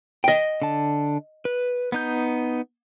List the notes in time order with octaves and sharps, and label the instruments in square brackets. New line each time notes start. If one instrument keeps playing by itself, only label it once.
[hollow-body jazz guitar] D#5 G5
[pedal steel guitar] D3 A5
B4
B3 D#4 G6